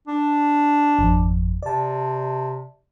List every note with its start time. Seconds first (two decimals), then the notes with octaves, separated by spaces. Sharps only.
0.08 D4
0.99 G#1 F2
1.63 C3 D5 A5